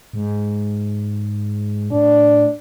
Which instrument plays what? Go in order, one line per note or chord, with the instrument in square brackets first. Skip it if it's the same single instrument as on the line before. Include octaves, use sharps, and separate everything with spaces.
[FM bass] G#2
[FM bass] A2 [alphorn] D4